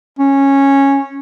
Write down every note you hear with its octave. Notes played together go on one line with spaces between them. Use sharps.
C#4